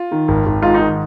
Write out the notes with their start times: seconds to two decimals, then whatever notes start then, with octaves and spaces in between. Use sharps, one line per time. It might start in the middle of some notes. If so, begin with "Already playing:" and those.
Already playing: F4
0.12 D#3
0.28 G#1
0.46 G#1
0.62 G#2 F4
0.74 D#4
0.80 D#3